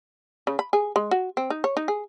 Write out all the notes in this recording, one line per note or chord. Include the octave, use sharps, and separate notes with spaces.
C#3
B5
G#4
G#3
F#4
C4
D#4
C#5
D#4
G#4